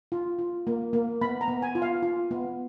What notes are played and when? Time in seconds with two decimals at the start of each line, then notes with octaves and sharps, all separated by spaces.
0.12 F4
0.39 F4
0.67 A#3
0.93 A#3
1.21 B3 B5
1.41 A#5
1.48 B3
1.62 G#5
1.75 F4
1.82 F5
2.02 F4
2.31 B3